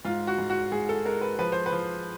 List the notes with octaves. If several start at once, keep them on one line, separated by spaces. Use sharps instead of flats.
G#2 F4
F#4
G#2
F#4
G#2 G#4
A4
G#3 A#4
B4
F3 B4
C5
B4
F3